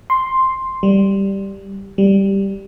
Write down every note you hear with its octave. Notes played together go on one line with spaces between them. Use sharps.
C6
G3
G3